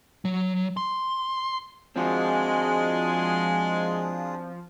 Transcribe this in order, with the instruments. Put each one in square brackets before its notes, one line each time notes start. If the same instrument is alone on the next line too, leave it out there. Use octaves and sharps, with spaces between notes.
[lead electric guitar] F#3
C6
[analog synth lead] F3 [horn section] G#3 [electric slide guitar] C4 F#4 [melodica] D4 F4 G#4